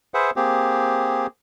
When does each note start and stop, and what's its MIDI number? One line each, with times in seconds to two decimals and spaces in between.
0.14 0.31 68
0.14 0.31 71
0.14 0.31 72
0.14 0.31 76
0.14 0.31 78
0.36 1.27 58
0.36 1.27 60
0.36 1.27 67
0.36 1.27 68